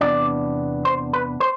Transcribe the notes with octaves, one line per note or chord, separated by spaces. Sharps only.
E2 C3 E3 B3 D4 D5
C5
B4
C5